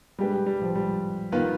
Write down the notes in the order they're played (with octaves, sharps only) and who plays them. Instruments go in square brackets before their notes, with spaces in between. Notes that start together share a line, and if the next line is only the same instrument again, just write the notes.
[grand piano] G3 [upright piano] G#3 D4 G4 B4
[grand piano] G3
G3
F3
G3
[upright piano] D#3 B3 F4 B4